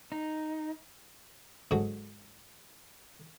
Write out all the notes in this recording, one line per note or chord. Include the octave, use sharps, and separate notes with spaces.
D#4
G#2 D3 F#3